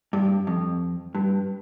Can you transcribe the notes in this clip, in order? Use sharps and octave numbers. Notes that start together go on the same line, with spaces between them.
G2
F2
G2